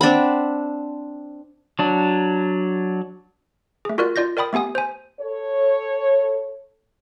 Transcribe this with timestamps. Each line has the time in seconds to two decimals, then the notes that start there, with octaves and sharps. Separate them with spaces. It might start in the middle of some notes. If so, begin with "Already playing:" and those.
0.01 C4 D4 F#5 B5
1.79 F#3 D4
3.85 A3 G#4
3.98 F4 F#4 A#4 D5 F#6
4.16 F4 D5 G6 A#6
4.37 A#4 D5 G5 B5 D#6
4.53 A3 B3 G4 G#5 D#6
4.75 C5 G#5
5.21 A4 C#5